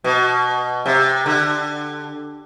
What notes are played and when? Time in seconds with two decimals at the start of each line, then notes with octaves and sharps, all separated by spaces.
0.04 B2
0.86 C3
1.26 D3